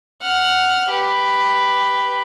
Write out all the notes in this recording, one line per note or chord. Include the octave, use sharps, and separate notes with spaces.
F#5 F6
G4 B4